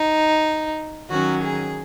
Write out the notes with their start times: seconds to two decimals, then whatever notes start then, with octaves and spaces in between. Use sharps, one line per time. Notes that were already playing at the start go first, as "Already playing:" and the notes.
Already playing: D#4
1.09 D#3 F#3 C#4 F#4
1.43 G#4